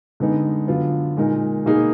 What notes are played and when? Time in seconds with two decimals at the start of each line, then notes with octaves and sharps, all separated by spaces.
0.20 D3 G#3 B3 D#4
0.68 D3 F#3 B3 F4
1.17 A#2 G#3 D#4 A#4
1.65 B2 A#3 D#4 G#4